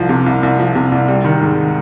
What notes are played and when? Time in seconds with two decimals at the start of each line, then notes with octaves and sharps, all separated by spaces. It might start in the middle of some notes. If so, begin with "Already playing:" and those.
Already playing: C2 F3
0.09 C3
0.26 C2
0.43 C2
0.59 F3
0.75 C3
0.92 C2
1.08 G3
1.25 D#3
1.41 G#2